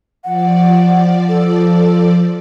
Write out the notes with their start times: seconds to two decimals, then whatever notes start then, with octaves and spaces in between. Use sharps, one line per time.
0.24 F3 D5 F#5
1.29 A4